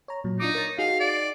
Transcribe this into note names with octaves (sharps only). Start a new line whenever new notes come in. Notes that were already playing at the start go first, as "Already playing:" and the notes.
C#5 A#5
A#2 F#3
D4 D#4 F4 D6
A#4 C#5 A6
D#4 F#4 G#4 F5
D5